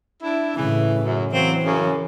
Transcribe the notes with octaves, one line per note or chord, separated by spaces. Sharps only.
D4 E4
A2 C#3 E3
F#2
E3 F#3 A#3 C4
F#2 C#3